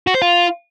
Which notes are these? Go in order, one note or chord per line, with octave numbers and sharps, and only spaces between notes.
F#4
C5
F4